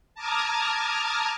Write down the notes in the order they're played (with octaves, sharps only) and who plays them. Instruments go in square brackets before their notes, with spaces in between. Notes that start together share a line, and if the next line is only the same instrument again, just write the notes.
[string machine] A5 A#5 D6 D#6 F6 G#6